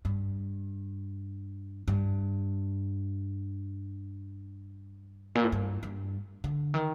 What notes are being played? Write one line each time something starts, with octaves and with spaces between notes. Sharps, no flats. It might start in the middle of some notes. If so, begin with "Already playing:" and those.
G2
G2
A#2
A2
G2
G2
D3
D#3